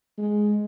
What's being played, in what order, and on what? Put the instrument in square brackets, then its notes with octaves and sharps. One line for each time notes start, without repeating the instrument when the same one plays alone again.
[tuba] G#3